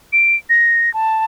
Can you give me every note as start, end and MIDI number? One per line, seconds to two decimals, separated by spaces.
0.13 0.36 98
0.50 0.92 94
0.94 1.25 81